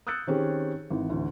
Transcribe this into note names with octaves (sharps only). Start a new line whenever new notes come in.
D#6 E6 F#6 G6 A6 C#7
D#3 C4 C#4 G4 G#4
G#1 E3
A1 D2